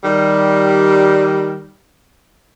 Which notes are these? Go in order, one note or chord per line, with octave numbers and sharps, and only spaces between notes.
D#3 G3